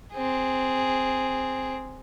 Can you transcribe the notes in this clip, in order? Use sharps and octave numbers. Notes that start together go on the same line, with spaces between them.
C4 G#4